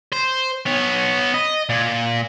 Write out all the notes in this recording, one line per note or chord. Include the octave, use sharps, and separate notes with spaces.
C5
B3 C#5
D#5
A#2